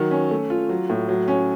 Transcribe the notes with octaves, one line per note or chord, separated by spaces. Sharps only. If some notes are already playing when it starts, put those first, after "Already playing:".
Already playing: D#3 F#3
C#4
A3
F4
F#3
A2
F#3
C#4